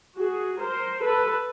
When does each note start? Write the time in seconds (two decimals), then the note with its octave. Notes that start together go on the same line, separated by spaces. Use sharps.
0.17 F#4 G#4
0.61 A#4 C5
1.03 A4 B4